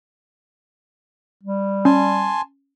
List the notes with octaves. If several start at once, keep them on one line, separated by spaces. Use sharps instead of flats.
G3
C#4 G#5 A5 C6